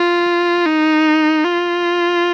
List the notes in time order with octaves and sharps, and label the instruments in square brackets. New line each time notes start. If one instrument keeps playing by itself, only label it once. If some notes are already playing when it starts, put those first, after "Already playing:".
Already playing: [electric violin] F4
D#4
F4